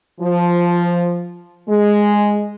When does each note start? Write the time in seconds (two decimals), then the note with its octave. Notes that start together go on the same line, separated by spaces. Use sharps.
0.21 F3
1.68 G#3